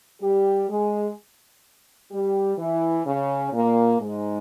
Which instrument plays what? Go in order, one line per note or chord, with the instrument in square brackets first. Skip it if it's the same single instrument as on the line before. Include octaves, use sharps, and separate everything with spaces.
[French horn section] G3 G4
G#3 G#4
G3 G4
E3 E4
C#3 C#4
A#2 A#3
G#2 G#3